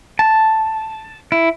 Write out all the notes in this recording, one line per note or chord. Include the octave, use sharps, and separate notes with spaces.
A5
E4